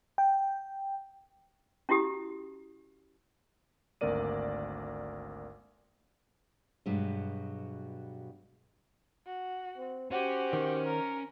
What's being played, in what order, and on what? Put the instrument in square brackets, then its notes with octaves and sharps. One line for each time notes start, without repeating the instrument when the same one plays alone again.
[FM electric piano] G5
[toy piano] C#4 E4 F#4 G4 D#6
[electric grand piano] G#1 D2 A#3 A#4 D5 D#7
[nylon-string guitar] G2 B2 F#3 G#3
[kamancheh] F#4
[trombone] C4
[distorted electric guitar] C#4 [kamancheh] F#4 G4 [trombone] C5
[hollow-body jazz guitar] D#3
[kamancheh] A#4